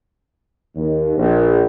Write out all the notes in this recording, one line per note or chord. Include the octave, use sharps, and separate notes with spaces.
D#2
A#1